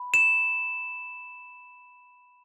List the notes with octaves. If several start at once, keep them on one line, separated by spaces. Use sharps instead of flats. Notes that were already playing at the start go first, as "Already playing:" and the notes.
Already playing: B5
E7